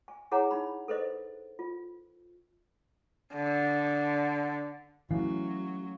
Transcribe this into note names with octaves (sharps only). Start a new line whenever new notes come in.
G#5
E4 G#4 C#5 F#5 G#5 A#5
D#4 B5
A4 B4 C5 D#5
F4
D3
E3 F#3 A3 C#4 F5